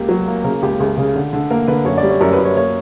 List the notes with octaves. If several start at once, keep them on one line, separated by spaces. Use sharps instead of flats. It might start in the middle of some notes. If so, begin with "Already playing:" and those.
Already playing: C#2 A#3 G4
F#3
A#3
C#3 A#4
C#2 G4
C#2
C#3
D3
D3
A#3 A#4
D3 B4
F#2 C#5
D5
G3
C#5
F#2 A#4
B4
F#2
C#5
A#3 C#5